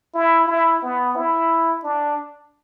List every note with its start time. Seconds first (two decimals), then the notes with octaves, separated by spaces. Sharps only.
0.14 E4
0.48 E4
0.82 B3
1.16 E4
1.84 D4